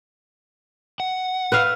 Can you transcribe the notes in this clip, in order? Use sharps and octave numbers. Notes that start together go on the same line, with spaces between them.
F#5
B4 E5 F5